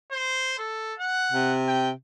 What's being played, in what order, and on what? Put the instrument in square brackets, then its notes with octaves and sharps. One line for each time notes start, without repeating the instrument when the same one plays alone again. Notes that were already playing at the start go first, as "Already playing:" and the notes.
[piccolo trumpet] C5
A4
F#5
[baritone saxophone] C3
[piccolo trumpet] G5